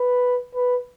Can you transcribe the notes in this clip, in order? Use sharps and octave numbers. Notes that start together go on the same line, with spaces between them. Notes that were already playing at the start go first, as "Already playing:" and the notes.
Already playing: B4
B4